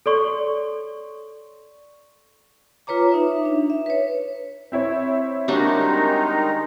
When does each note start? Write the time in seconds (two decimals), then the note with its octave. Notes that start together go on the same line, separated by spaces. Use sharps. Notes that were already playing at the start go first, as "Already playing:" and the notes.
0.06 A4 C#5 D5 C6 C#6
2.87 F4 B4 C#5 A#5 D6
3.12 D#4 E5
3.45 D4
3.70 E5
3.86 B4 C#5
4.72 C4 E4 C#5
5.48 D#3 G3 G#3 D4 D#4 F#4